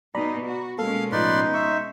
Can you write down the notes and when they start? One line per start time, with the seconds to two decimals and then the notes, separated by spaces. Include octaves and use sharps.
0.15 B2 D#4 D5 A#5 B5
0.45 F#4
0.79 B2 G#3 A#3 C#4 A4 F5
1.12 A2 F3 D#4 B4 D5 C6
1.54 E5 C6 C#6